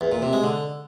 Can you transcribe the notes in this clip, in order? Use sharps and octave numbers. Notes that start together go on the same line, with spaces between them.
E2
A#2
C3
G#3
D3